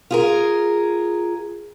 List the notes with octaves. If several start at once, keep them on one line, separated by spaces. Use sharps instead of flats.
F4 G#4 A#4